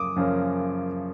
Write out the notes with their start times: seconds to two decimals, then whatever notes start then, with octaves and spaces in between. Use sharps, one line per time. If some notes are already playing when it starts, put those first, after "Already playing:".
Already playing: F#2 C#3 F3 A#3 C#4 D6 D#6
0.16 F#2 C#3 F3 A#3 C#4